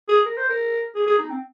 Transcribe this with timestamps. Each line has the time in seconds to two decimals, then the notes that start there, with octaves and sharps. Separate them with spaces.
0.08 G#4
0.26 A#4
0.37 C5
0.49 A#4
0.95 G#4
1.07 G#4
1.18 D#4
1.30 C4